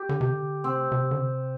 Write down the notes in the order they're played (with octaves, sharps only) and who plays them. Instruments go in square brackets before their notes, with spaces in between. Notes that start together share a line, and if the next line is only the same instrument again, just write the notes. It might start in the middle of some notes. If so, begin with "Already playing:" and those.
Already playing: [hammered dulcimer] G4
[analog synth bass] D3
C3
D3
[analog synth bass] C3 [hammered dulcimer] C4
[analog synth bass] C3
D3
C3